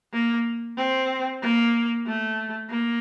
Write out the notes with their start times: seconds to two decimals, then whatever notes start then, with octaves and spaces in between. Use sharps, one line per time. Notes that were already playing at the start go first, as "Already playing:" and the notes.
0.13 A#3
0.77 C4
1.42 A#3
2.07 A3
2.70 A#3